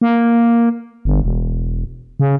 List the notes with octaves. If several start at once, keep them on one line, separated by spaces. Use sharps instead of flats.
A#3
G1
E1
C#3